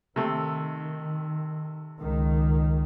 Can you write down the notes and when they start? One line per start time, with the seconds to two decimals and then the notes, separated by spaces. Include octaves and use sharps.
0.16 C3 D#3 A3
1.99 C#2 D#3